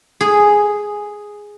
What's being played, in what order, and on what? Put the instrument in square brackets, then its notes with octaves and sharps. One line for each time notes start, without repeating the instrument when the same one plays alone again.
[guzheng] G#4